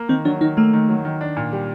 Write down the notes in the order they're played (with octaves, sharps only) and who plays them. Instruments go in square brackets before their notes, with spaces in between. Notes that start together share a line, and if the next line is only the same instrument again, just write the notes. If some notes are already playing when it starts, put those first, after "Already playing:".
Already playing: [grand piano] A#3
[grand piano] D#3 [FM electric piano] C4
[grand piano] F#3 [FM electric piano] D4
[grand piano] D#3 [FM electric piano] D#4
[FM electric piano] A3 [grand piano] A#3
[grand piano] D#3
F#3
D#3
D4
A#2
G3